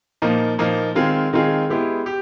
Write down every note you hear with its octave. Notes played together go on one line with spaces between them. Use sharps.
A#2 F3 A#3 D#4
A#2 F3 A#3 D#4
D#3 G#3 C4 F4 G#4
D#3 G#3 C4 F4 G#4
G#3 B3 E4 G4
G4